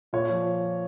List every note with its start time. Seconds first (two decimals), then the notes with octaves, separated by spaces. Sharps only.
0.13 A#2 C#5
0.30 F3